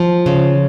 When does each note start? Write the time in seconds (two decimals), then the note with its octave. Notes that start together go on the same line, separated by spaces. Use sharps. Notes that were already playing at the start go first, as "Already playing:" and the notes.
Already playing: F3
0.26 C#3